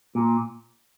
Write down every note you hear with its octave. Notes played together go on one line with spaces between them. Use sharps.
A#2